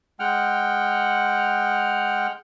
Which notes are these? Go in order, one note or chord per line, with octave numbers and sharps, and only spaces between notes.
G#3 F#5 G5 F6